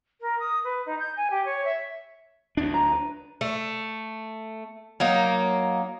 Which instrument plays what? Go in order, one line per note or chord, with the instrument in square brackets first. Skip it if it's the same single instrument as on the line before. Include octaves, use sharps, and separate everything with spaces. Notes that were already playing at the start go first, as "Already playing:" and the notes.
[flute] A#4
D#6
B4
D#4
G6
G#5
G4
C#5
E5
[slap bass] D2 D4
[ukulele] A#5
B4
[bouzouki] A3
F#3 A#3 D#4